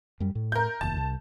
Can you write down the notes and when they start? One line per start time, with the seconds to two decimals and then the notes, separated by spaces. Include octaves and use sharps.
0.20 F#2 G3
0.35 A2
0.52 A#4 G6
0.81 F1 D#2 A5
0.97 C2